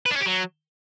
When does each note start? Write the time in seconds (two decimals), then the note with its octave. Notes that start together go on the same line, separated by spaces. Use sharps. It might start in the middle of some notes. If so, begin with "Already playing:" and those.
0.06 B4
0.11 D4
0.16 C#4
0.21 G4
0.26 F#3